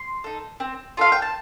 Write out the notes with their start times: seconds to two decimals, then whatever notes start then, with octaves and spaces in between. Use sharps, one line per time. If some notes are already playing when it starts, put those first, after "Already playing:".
Already playing: C6
0.24 D#4 A4
0.60 C4
0.97 F4 A4 F5
1.12 G5
1.22 A5